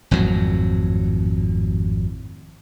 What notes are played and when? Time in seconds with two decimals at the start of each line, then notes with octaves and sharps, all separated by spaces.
0.11 G#1 F2 A2 F#3